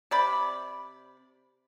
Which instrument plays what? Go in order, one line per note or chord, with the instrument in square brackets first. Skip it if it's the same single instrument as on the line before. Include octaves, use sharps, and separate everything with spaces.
[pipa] C3 D5 B5